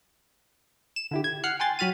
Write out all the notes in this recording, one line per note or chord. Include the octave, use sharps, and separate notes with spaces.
E7
D3 E4 G4
G#6
F#5 F6 F#6 C7
G5 G#5 C6 A6
F#3 F#4 B5 F6 A6 D#7